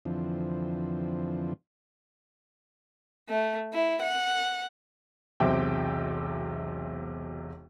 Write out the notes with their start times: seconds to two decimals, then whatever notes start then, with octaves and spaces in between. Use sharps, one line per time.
0.05 F2 D3 E3 F3 C4
3.29 A3
3.74 E4
4.02 F#5
5.40 E1 B1 C3 C5 E5 G5